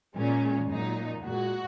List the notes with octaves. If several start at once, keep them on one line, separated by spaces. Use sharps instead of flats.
A#2 G#3 C#4
A#2 F#3 D#4
A#2 G#3 F#4